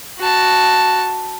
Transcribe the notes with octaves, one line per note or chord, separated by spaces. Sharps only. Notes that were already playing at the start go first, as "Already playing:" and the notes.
F#4 A5